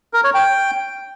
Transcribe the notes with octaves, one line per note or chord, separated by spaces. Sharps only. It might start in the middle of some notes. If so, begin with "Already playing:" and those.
A#4
C#5
G5